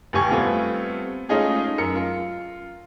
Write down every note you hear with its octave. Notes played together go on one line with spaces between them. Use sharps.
F1 D#2 G4 G#5 C#6 G#6
G3 A3 B3 C4 F4
G#3 A3 C#4 D#4 F4 G#4
F#2 A#4 C#7
F4